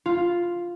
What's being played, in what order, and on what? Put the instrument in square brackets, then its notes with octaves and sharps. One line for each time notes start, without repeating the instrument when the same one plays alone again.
[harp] F4